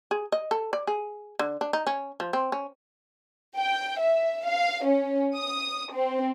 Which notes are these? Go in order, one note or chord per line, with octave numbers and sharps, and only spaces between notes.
G#4
D#5
A4
D5
G#4
D3
D4
D#4
C#4
F3
C4
C#4
G5
E5
F5
C#4
D#6
C4